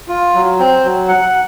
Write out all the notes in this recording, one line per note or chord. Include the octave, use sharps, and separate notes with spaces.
F4
F#3
C4
F#3
F#5